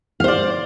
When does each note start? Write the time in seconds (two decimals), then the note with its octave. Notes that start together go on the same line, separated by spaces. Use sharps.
0.20 F5
0.24 C5
0.28 D5